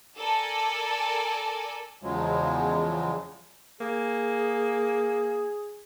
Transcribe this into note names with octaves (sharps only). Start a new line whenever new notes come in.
A4 A#4 D5 G#5
E2 C#3 F3 F#3 G#3
A#3 G#4